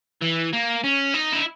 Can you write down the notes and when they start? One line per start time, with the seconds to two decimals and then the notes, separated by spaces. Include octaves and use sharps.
0.21 E3
0.53 A#3
0.84 C#4
1.14 D#4
1.33 E4